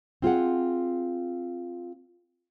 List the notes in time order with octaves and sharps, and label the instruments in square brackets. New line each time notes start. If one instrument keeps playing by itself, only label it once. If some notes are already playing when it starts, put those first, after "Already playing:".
[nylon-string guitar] C4 F4 G#4 F#5